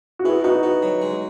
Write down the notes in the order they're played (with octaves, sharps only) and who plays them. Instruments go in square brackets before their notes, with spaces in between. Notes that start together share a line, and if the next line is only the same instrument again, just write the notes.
[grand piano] F#4
[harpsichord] B3 [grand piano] E4 G#4
[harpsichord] B3 [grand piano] D#4 F#4
[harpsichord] B3
F#3
G#3